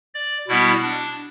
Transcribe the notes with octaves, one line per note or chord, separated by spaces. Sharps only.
D5
B2 G3 B3 E4
D4